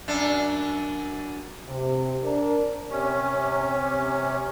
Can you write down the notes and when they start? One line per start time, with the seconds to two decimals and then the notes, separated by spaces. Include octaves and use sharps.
0.08 F#2 D4
1.68 C3
2.23 D4 A#4
2.90 C3 C#4